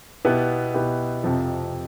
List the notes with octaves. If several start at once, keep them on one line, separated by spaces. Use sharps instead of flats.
B2 B3 E4 G4
B2 B3 E4 G4
F2 C3 F3